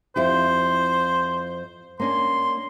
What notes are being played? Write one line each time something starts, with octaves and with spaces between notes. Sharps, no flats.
F2 E4 G4 C5
A#3 C#4 D4 C6